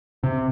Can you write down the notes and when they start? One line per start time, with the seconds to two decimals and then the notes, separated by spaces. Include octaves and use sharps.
0.24 C3